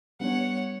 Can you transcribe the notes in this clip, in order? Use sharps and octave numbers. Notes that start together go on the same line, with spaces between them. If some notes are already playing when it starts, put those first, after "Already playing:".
G3 B3 D4 C#5 F#5